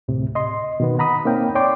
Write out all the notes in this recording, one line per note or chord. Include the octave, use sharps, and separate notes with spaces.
D2 A2 C3
D#5 C6
B2 D#3 B3
F#5 A#5 B5 D#6
A#3 C4 D#4 C#5 F5 G5
C#5 D5 G5 C6 D6